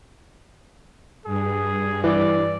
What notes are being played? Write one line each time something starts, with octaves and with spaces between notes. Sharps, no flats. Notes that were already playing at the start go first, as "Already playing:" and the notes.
G2 G#4
E3 D5